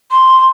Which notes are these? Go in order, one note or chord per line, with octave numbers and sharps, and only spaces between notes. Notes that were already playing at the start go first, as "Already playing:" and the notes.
C6